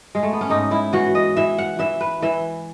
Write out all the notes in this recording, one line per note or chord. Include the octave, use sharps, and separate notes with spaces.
G#3
A3
B3
C#4
G#2 D#4
E4
E3 F#4
D#5
E3 E5
F#5
E3 E5
B4
E3 E5